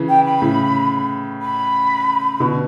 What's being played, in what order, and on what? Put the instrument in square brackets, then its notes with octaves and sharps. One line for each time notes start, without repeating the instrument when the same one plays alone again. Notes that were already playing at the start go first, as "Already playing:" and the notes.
Already playing: [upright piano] C#3 E3
[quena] G5
B5
[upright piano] A2 C#3
[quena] B5
[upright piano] B2 D3